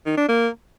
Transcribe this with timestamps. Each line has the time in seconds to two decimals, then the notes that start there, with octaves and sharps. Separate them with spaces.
0.06 D#3
0.17 D4
0.28 A#3